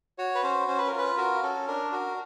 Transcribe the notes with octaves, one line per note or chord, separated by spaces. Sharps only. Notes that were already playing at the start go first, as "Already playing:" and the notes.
F#4 C#5
B4
C#4 C5
C#4 C5
B4
A#4
F4
B4
F#4 A#4
C#4 A4
D4 A#4
F#4 A#4